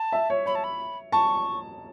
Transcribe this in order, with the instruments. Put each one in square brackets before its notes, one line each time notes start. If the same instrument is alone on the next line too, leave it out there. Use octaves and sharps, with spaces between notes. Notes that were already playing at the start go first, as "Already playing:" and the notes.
Already playing: [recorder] A5
[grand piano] E5
C#5
[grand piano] C#5 [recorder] B5
[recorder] A5
B5
[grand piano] A5 [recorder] C#6